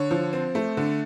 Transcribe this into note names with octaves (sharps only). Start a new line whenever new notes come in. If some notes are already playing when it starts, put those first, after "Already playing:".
Already playing: D3 C#5
F3
C4
A3
D3